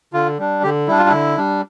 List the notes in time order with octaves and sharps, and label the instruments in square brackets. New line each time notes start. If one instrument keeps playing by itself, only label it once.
[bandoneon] D3 F4
G3 D4
D3 G4
G3 D4 E4
F4
D3 E4
G3 D4